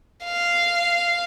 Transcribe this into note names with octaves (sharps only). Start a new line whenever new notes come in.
F5